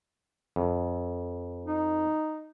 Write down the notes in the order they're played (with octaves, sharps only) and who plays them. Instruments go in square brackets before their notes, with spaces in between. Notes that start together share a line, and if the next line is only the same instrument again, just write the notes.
[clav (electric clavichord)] F2
[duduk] D#4